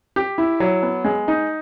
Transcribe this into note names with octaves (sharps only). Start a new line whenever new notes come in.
G4
E4
F#3
B3
G#3
D#4